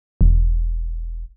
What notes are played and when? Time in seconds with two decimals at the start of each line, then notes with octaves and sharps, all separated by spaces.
0.21 E1